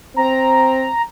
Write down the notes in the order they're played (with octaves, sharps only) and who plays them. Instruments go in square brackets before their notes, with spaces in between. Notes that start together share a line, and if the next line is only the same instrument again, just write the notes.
[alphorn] C4 [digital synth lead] A#5